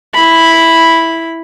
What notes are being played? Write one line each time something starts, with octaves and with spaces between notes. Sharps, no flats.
E4 B5